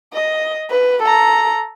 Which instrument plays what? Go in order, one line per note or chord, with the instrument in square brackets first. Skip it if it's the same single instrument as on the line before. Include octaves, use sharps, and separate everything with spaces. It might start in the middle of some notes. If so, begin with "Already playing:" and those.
[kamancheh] D#5
B4
A4 A#5